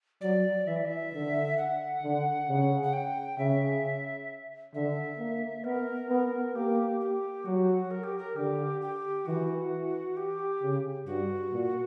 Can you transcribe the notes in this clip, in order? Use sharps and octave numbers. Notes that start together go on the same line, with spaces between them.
F#3 D5
E3 E5
D5
E5
D3
F#5
D3
C#3
F#5
G5
C#3 E5
D3 E5
A#3
B3 A#4
B3
A#3 G4
G4
F#3 F#4
A#4
G4
A#4
D3 G4
G4
E3 F#4
G4
C#3
G2 F#4
A#2